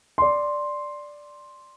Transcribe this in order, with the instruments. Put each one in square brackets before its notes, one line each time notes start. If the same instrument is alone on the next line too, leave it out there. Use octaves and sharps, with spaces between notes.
[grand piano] D5 C6